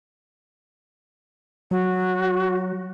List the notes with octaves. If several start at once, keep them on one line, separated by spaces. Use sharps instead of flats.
F#3 F#4